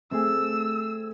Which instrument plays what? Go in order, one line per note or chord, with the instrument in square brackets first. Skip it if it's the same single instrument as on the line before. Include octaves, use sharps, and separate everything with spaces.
[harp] A3 [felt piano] C4 [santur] G#4 E5 [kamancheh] E6